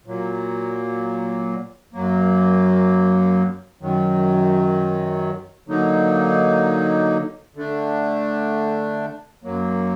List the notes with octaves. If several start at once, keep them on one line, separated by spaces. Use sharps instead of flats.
A#2 F#3 A#3
F#2 F#3 A#3
F#2 D#3 F#3
D3 F#3 A#3 D#4
D3 A3 D4
F#2 F#3 A#3